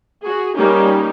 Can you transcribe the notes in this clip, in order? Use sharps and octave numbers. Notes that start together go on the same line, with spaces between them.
F#4 G#4
G3 A#3 C#4 D#4 G4